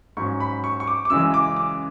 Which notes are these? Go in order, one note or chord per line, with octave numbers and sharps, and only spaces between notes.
G#2 F#3 C#4 C#6
B5
C#6
C#6
D6
D6
F#2 C#3 E3 G#3 E6
D6
D6